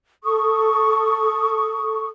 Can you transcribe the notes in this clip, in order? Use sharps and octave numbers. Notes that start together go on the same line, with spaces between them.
A4 C#6 D#6